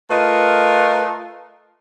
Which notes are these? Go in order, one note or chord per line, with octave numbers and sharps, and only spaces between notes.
A3 F4 A#4 B4 D#5